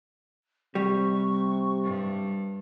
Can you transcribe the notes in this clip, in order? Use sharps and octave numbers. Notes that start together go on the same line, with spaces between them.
C3 G3 C#6
G2